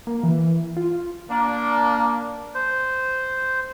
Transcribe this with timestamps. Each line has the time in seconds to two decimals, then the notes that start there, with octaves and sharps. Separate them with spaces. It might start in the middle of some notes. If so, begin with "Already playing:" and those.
0.07 A#3
0.23 E3
0.77 F4
1.29 A#3 D4
2.54 C5